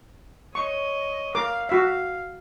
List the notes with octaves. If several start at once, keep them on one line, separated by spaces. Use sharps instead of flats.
C#5 D#5 C#6
A#4 F5 D6
F#4 E5 F5